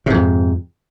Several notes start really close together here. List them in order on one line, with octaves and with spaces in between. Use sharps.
C3 G#2 F2